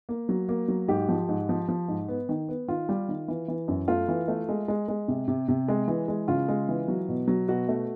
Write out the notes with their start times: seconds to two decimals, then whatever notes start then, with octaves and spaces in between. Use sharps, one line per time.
0.09 A#3
0.29 F#3
0.49 A#3
0.68 F#3
0.88 G#2 G4
1.09 F3
1.28 G#2
1.49 F3
1.68 F3
1.88 G#2
2.08 B3
2.29 D#3
2.48 B3
2.68 D#3 F4
2.89 G3
3.09 D#3
3.28 E3
3.48 E3
3.68 F#2
3.88 A3 F4
4.08 E3
4.28 A3
4.49 G#3
4.68 G#3
4.88 G#3
5.08 C3
5.28 C3
5.48 C3
5.68 G#3
5.88 E3
6.08 G#3
6.28 C#3 F4
6.48 G#3
6.69 E3
6.88 F#3
7.08 B2
7.27 F#3
7.48 B2 F#4
7.68 A3